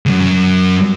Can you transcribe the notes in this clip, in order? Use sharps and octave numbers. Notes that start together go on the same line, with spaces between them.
C#2 F#2